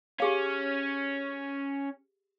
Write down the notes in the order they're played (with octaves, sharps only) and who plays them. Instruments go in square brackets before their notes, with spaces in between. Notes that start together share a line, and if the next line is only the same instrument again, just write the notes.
[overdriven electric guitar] C#4 [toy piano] G4 G#4 F5